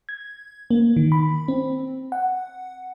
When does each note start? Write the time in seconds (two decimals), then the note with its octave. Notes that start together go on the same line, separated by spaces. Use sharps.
0.09 G#6
0.71 A#3
0.96 D#3
1.12 B5
1.48 C4
2.12 F#5